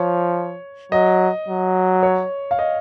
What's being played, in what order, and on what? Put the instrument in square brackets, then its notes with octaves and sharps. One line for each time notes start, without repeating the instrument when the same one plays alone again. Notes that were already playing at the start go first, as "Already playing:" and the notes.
Already playing: [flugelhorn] F3 [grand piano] C#5
[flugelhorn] F#3 [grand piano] D#5
[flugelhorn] F#3
[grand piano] C#5
F5
D#5